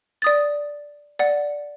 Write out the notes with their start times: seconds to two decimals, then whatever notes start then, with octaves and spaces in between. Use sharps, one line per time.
0.22 D5 D#6 A6
1.19 D5 F#5